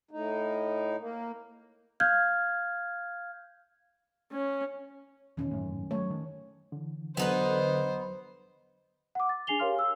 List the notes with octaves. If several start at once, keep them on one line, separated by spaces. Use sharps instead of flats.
A2 D#4
A#3
F5 F6 G6 G#6
C#4
E2 B2 D#3 C#4
G#1 F#2 A2
F#3 G3 A3 C#5
D#3
D3 E3
E2 D3 F#3 B3 D#4 B4 C5
F#5 D6
A6
D4 G#4 G#5 C7 F7 G7
G4 A#4 C#5 F5 C6 F6
E6